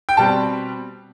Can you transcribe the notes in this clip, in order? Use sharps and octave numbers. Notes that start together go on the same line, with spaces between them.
G5
B2 G3 C4 A5